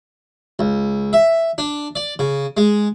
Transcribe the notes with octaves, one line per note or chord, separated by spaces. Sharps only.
C#2
E5
D4
D5
C#3
G#3